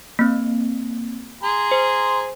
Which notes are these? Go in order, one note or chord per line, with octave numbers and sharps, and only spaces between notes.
A#3 C4
G#4 A#5 C6
C5